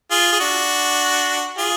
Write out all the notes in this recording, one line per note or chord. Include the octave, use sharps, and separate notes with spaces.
F4 G#4
G#4
D4 F#4
F4 G#4